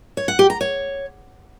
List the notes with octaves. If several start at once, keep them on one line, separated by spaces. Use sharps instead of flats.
C#5
F#5
G4
A#5
C#5